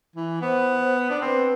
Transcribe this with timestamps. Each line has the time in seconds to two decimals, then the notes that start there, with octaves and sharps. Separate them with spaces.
0.16 E3
0.42 B3 C5
1.10 D4
1.22 C4 B4